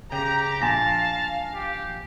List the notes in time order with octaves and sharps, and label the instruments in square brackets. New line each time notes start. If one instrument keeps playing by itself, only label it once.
[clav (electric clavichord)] C#3 G5 [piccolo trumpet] G4 [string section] A#5
[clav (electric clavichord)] A#1 [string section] F5 [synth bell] G#5 A#6 [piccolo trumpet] A5
[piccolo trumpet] G4